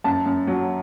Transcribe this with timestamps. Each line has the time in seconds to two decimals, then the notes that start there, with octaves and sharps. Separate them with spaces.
0.04 F#2 A5
0.26 F#2
0.47 F#3